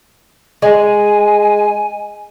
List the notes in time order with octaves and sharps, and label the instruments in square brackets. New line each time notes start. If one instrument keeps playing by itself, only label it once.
[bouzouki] G#3 [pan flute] G#5